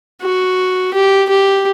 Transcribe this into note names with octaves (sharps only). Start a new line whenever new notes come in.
F#4
G4
G4